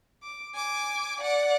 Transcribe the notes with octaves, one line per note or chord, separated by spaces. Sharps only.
D6
G#5 D6
D5 F#5